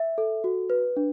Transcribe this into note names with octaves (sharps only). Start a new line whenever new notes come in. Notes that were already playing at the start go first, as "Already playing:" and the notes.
Already playing: E5
A4
F#4
B4
D4